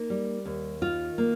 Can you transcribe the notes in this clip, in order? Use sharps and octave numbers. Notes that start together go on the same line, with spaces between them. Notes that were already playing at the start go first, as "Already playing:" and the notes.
Already playing: A#3 D#4
G3
D#2
D#3 F4
A#3